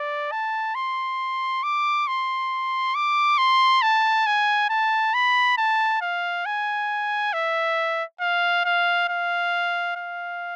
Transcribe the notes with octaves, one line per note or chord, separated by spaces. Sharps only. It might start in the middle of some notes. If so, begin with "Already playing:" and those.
Already playing: D5
A5
C6
D6
C6
D6
C6
A5
G#5
A5
B5
A5
F5
G#5
E5
F5
F5
F5
F5